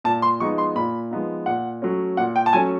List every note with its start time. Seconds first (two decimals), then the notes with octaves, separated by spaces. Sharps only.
0.04 A#2 A5
0.22 C6
0.40 F3 G#3 B3 D#4 C#6
0.58 C6
0.76 A#2 B5
1.11 F3 G#3 B3 D#4
1.46 A#2 F#5
1.82 F#3 A3 C#4
2.17 A#2 F#5
2.36 G5
2.46 A5
2.53 F#3 A3 C#4 G#5